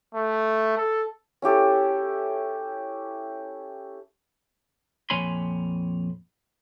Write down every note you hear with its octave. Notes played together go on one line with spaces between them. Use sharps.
A3
A4
C#4 E4 G4 A4
F2 A#2 C#5 G#5 B5 C6